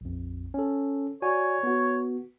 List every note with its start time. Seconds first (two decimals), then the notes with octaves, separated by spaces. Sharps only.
0.01 A#1 F2
0.54 C#4 A4
1.22 F#4 C#5 D5 G#5
1.63 B3 F#4